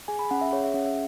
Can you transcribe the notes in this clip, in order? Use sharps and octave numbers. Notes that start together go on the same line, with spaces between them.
G#4 G#5
B5
C#4 F#5
E5
G#4 C#5
E5
C#4 F#5
E5